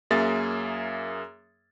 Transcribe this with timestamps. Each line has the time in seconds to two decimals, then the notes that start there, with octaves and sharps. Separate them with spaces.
0.11 F#2 A#3 G#4 E5 A6